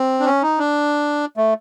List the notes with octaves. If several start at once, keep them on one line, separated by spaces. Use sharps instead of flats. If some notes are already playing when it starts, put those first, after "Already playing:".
Already playing: C4
D4
C#4
D#4
D4
A3